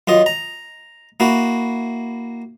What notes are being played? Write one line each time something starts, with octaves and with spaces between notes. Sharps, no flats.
F#2 F4 D#5
A#5
A#3 E4 F#4